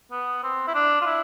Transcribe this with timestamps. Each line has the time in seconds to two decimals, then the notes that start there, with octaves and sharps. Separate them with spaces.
0.12 B3
0.44 C4
0.67 E4
0.74 D4
1.02 F4
1.06 E4